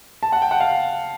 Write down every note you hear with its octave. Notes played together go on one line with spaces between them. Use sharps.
A5
F#5
G5
F#5
F5